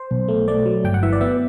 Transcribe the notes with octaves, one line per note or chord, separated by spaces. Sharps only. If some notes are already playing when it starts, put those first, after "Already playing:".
Already playing: C5
B1
A3
A3 D5
F#3
G1 G5
F#5
E3 E5
D5
B3 E5